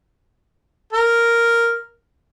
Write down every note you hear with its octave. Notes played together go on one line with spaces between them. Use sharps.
A#4